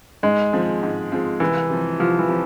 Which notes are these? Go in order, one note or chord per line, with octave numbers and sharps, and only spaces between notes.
G#2 G#3
F3 C4 F4 G#4
G#2
F3 C4 F4 G#4
C2 E3
C3 F3
C2 F3
E3
C3 F3